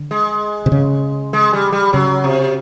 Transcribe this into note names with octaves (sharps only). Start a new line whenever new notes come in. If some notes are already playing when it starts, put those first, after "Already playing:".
Already playing: D3
G#3
C3
C#3
G#3
G3
G3
C#3 F#3
C3